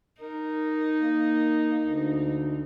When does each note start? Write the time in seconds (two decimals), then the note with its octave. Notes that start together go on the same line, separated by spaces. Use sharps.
0.21 D#4 A#4
1.00 A#3
1.82 D2